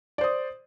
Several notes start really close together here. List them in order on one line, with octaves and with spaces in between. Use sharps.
D5 C5 D#6